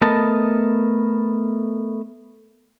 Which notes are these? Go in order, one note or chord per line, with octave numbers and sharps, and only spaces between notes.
A3 B3 A#4 D#5 A5